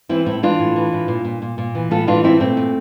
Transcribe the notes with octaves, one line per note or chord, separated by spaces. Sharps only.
E3 C4 E4
A2 C4 E4
E3 D4 F4
A2
E3
A2
A#2
A#2
A#2
A#2
E3
A2 F4 A4
E3 D4 F4
A2 C4 E4
A#2 A3 C4
A#2